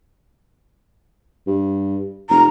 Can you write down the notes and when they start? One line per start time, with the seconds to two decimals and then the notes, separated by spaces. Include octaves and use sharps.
1.47 G2
2.30 F1 A#5